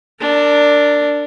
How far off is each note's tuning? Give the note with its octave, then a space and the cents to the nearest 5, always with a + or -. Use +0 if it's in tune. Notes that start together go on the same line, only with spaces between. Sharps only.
D4 +0 A#4 -30